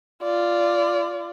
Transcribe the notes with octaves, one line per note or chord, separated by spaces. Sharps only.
F4 D5